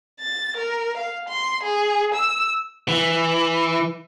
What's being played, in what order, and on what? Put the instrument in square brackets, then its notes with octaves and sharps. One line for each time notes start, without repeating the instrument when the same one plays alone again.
[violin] A6
A#4
F5
C6
G#4
E6
[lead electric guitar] E3